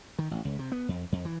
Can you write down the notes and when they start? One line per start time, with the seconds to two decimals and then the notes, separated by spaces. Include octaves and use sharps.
0.19 D#3
0.31 A1
0.45 C#2
0.59 C3
0.72 B3
0.88 F2
1.12 F2
1.25 E3